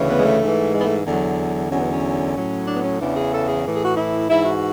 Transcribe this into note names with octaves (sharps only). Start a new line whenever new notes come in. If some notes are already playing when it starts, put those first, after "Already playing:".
Already playing: D2 C#3 E3
B3
G#3
A3
G#2 E3
G#3
B3
A3
E2 D3 F#3
E2 D3 F#3 C#4
B3
C#4
A2 F#3
D4
B3
C#4
E2 C#3 E3 D4
G#4
A4
G#4
A2 E3
G#4
F#4
E4
G#2 E3 E4
F#4